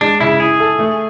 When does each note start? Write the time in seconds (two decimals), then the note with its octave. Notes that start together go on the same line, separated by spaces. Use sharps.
0.01 G#3 D4
0.20 C#3 E4
0.40 E4 G#4
0.60 A4
0.79 A3